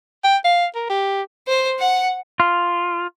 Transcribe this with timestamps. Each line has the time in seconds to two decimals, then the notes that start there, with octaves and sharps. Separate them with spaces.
0.24 G5
0.44 F5
0.75 A#4
0.90 G4
1.48 C5
1.79 F#5
2.40 F4